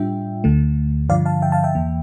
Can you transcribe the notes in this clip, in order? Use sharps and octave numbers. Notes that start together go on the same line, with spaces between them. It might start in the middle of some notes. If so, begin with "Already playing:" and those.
Already playing: A2 G3 D4 F4 E5 G5
D2 D3 A3
G2 D3 F3 D5 F5
F5 A5
E5 G5
F5 A5
E5 G5
E2 E3 A#3